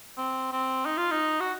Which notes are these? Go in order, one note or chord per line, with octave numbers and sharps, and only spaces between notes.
C4
C4
D#4
F4
D#4
F#4